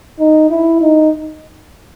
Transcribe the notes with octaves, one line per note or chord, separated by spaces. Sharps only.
D#4
E4
D#4